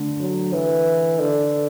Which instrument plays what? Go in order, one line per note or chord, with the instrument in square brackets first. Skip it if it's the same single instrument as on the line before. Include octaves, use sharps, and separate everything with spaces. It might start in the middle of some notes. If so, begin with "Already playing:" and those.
Already playing: [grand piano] D3 A3
[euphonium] F#3
E3
D3